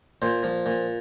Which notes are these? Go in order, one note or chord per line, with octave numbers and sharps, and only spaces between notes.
A#2 C5
F3
A#2